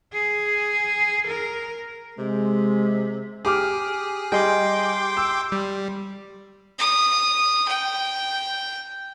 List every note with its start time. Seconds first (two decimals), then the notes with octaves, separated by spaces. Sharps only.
0.13 G#4
1.28 A#4
2.19 C3 G#3
3.45 G4 G#4 D6 F6
4.32 G3 G#4 D#5 G5 C6 D6
5.17 E6
5.52 G3
6.79 D#6
7.68 G5